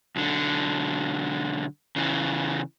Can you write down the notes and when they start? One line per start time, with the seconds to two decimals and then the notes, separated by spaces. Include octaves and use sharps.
0.16 B1 D3
1.96 C#3 E3